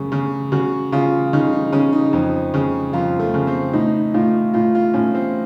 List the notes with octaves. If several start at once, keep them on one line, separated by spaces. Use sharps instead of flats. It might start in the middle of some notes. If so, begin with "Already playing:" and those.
Already playing: F#2 C#3
C#3
C#3 F#4
C#3 F4
C#3 D#4
D#4
C#3 C#4
D#4
F2
C#3
F2 F4
A3
C#3
C4
A2 D#4
A2 F4
A2 F4
F4
A2 C#4
C4